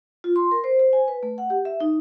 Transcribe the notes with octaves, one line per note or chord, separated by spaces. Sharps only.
F4
C6
A#4
C5
C5
G#5
B4
A3
F#5
G4
E5
D#4